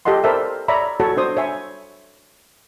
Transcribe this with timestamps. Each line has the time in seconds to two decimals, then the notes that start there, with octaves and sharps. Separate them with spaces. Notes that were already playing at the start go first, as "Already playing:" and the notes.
0.05 G4 A4 D#5 F#5 C6
0.24 A4 A#4 C5 D5 E5
0.68 C#5 D5 E5 A#5 B5
1.00 F#4 A4 C#5
1.17 D4 C5 D#6
1.37 C#5 E5 G#5